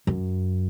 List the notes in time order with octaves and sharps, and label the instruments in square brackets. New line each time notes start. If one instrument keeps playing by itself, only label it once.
[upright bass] F#2